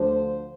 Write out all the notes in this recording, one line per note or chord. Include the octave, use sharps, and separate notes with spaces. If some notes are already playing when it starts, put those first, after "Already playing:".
Already playing: D2 D3 F3 C5